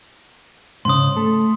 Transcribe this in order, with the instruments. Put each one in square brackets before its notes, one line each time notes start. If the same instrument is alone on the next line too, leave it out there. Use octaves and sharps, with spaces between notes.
[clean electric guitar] G#2 C#3 [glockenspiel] C6 D#6
[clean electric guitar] A3 A4